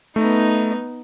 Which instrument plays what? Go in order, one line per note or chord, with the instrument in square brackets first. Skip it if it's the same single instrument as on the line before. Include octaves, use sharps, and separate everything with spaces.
[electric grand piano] A3 [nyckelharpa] B3 D#4